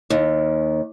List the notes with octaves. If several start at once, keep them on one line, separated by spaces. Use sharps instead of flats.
D#2